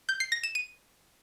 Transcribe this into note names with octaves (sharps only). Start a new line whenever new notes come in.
G6
C7
A#6
E7
D#7